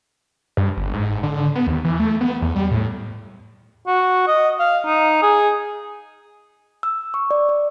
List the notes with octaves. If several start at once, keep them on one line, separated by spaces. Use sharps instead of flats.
G2
G1
G#2
D3
B3
D#2
E3
A3
B3
E2
G3
A2
F#4
D#5
F5
D#4
G#4
E6
C#6
D5
D5